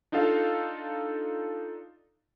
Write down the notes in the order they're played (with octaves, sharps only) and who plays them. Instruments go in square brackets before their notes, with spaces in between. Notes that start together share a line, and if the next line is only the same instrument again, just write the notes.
[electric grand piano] D4 D#4 F4 A4 F5